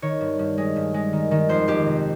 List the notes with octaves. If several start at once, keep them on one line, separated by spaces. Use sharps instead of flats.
D#3 C#5
G2
G2
G#3
G2
G#3
D#3
D#3
F2 C5
F2 G4
C3